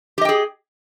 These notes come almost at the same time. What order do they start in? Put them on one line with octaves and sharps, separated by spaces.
G4 D#5 G5 G#4